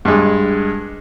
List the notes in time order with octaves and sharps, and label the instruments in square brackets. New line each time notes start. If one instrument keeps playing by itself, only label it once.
[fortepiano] G2 G#3